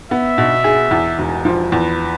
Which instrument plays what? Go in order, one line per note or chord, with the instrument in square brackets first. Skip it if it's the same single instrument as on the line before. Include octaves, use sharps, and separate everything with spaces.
[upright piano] B3 [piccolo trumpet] E5
[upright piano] B2
G#4
E2
E1
F3
[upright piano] E2 [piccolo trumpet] B4